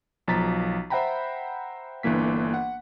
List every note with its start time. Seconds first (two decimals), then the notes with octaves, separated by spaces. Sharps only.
0.28 B1 F3 A#5 A6 B6
0.90 C5 E5 F#5 G5 A#5 B5
2.03 G1 D3 E3 A#3 B6
2.54 F#5